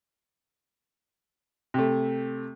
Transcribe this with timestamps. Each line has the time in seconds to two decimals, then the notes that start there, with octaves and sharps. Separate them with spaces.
1.74 C3 A3